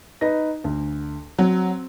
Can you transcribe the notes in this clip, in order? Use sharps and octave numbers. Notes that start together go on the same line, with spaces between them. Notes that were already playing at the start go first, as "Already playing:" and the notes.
D#4 B4 A#6
D2
F#3 C4